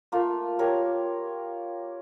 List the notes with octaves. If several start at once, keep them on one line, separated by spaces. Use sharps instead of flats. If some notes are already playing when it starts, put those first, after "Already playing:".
A3 A#3 F4
G4 A#4 C#5